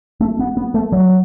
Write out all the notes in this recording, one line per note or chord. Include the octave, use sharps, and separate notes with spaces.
A3
B3
B3
A3
F#3